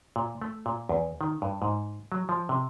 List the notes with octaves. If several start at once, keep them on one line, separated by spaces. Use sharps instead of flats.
A#2
A3
A#2
E2
D#3
G2
G#2
F#3
F3
C3